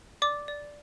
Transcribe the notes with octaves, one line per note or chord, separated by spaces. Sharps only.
D5 D6
D5